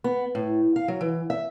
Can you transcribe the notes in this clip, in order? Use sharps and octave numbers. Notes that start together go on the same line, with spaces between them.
B3
A2
F5
F#3
E3
E5